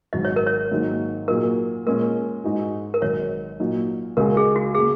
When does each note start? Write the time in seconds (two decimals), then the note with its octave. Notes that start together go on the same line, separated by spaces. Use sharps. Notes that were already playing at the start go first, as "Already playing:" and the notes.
0.13 G#1 G#2 F#3 D#5
0.25 C#5
0.36 A#4
0.47 C#5
0.71 G#2 D#3 F#3 A#3 F#4
1.28 A#2 F#3 D#4 G#4 A#4
1.86 A#2 G#3 C#4 A#4
2.44 G#2 G#3 D#4 F#4
2.94 A#4
3.02 G#1 G#2 F#3 C#5
3.60 A#2 F#3 D#4
4.17 C#2 C#3 G#3 F#4 A#4
4.37 G#4
4.56 F#4
4.75 C#3 A#3 G#4